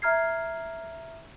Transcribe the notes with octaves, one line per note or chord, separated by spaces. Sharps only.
E5 A#5 F6 G#6 C7